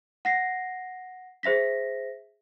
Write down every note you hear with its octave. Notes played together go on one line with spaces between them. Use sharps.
F#5 A#6 C7
G#4 C5 E5 A#6 B6